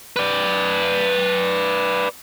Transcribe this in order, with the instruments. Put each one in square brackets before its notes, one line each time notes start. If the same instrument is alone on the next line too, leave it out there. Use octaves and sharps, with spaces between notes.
[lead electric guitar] B4 D5